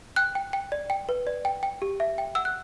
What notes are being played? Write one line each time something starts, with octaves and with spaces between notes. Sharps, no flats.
G5 F#6
G5
G5
D5
G5
B4
D5
G5
G5
G4
E5
G5
F#5 E6
F#6